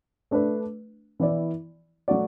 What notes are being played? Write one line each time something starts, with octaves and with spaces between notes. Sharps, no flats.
A3 D4 B4
E3 B3 E4 D5
F#3 A3 F#4 D5